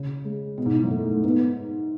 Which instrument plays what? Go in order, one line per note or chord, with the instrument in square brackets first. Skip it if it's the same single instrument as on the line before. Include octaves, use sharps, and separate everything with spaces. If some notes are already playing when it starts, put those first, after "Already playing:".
Already playing: [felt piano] C#3
[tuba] G#3
[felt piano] B2
G#2
A2
F#2
[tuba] A3
[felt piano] G#2 [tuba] B3